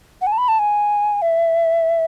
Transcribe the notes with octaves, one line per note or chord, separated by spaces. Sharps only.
F#5
G#5
A5
B5
A5
G#5
E5